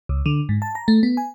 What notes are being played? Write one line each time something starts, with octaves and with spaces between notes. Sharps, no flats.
C#2
D3
G#2
A5
A#5
A3
B3
G#5